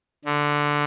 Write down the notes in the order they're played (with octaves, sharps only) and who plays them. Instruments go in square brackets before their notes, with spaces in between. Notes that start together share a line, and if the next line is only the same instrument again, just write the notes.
[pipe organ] D3